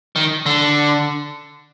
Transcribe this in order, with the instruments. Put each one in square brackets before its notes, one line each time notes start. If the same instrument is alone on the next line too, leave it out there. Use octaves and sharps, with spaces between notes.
[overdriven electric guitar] D#3
D3